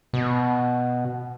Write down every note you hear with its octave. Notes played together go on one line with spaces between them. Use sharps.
B2